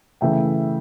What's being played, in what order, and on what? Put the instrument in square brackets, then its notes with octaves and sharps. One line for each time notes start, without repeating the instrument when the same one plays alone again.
[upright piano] C#3 E3 A3 E5 G5